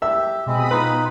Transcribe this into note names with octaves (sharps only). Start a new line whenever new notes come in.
G4 E5 E6
B2 G#3 C4 B5 D#6
D#4 F4 B4